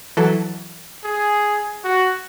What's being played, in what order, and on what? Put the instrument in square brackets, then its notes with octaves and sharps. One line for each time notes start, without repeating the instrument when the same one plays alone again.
[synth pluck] E3 F#3 A4
[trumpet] G#4
F#4